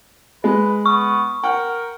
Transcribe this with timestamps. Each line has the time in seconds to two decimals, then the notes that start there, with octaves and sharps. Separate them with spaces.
0.44 G#3 B4
0.86 B3 C#6
1.44 A#4 F#5 G5